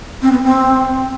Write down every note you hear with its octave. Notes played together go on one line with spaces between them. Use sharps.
C4
B3
C4